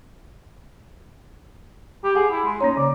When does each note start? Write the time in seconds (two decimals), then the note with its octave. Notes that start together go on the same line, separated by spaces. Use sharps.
2.04 G4
2.15 G#4 F#5
2.31 E4
2.45 G#3
2.61 A#3 C#4 D#4 C#5
2.77 C#3 D5